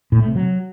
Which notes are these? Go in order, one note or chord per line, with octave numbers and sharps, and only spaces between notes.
A2
A3
C3
F#3